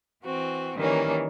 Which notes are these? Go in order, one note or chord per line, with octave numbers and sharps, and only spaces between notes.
E3 C4 F#4
D#3 E3 G3 A#3 C#4